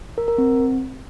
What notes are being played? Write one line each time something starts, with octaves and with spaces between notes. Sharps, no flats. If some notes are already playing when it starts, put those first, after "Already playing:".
A#4
A#4
C4